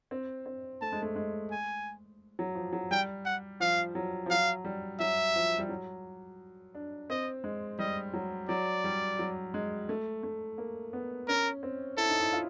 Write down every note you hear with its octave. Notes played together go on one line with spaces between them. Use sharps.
C4
C4
A3 A5
G#3
A3
G#3
G#5
F#3
F3
F#3
G3 G5
F#5
F3 F5
F#3
F3
F#3 F5
G3
F#3 E5
F3
G3
F#3
D4
C4 D#5
G#3
G3 D#5
F#3
F#3 D5
G3
F#3
G#3
A3
A3
A#3
B3
C#4 A#4
C4
E4 A4
D#4
E4
F4